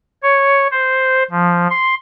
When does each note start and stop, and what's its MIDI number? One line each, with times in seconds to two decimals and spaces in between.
0.23 0.68 73
0.72 1.23 72
1.31 1.67 53
1.70 1.95 84